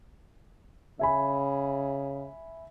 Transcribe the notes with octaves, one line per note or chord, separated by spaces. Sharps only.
C#3 E5 G#5 B5